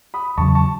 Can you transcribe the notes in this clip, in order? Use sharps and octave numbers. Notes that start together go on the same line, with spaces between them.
B5 D#6
E2 C#3 F#3 A5 C#6
A5 C#6